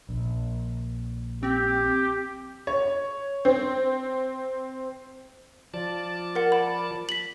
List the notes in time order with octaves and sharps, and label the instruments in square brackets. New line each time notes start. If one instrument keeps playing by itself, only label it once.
[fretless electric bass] A#1
[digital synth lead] C4 [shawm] G4
[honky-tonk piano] C#5
C4
[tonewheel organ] F3 D5 A5
[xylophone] A#4 F#5
B5
B6 F#7